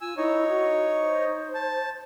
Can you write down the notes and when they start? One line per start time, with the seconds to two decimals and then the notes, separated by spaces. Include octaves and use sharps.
0.01 F4 G#5 E6
0.17 D#4 E4 C#5
0.48 F#4
1.00 C5
1.54 A5